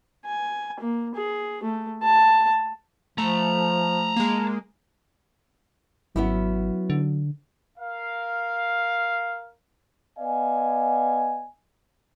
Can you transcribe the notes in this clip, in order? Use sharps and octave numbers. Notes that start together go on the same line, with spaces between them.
G#5
A#3
G#4
A3
A5
F3 A3 A5 A#5
G#3 A#3
G#1 F#3 B3 C#4 E4
D3
A#4 F5
B3 D5 D#5 F5 G#5